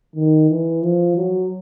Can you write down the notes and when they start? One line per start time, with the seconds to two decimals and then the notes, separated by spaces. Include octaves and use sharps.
0.16 D#3
0.50 E3
0.82 F3
1.17 F#3